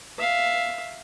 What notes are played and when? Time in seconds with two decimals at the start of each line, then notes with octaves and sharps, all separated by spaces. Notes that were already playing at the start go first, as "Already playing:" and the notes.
0.19 E5 F5